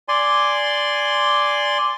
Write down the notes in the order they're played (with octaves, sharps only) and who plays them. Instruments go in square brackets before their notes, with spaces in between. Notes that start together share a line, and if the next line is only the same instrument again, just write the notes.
[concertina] D5 G#5 C6